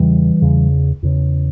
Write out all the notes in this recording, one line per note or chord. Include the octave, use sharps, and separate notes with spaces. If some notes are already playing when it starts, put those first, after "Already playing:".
Already playing: E2 C#3 E3 G3
E2 C#3
E2 C#3